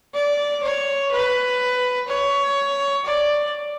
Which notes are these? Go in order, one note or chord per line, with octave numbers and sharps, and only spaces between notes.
D5
C#5
B4
C#5
D5